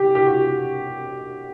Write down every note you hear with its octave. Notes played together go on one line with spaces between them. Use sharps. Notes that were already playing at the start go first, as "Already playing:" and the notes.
Already playing: G4
G4
F#4